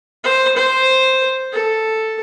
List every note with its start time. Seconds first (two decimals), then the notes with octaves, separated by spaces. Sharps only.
0.24 C5
0.56 C5
1.53 A4